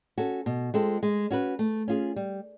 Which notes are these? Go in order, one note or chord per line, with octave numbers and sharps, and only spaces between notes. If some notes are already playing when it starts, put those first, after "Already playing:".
C#4 F#4 A4
B2
G#3 C4 F4 A4
G#3
C#4 F#4 B4
A3
C#4 F4 G#4
G3